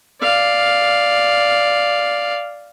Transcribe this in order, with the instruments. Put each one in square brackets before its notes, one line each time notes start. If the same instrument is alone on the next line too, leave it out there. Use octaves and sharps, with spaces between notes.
[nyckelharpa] D5 F5